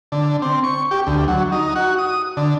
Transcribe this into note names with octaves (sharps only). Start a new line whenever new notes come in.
D3
C4
C#6
G4
D2
F#3
D#4
F#4
D#6
D3